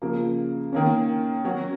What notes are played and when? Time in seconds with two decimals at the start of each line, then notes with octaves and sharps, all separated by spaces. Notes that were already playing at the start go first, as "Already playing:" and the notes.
0.02 C#3 F3 A#3
0.73 D#3 A#3 C#4
1.45 F#3 C#4 F#4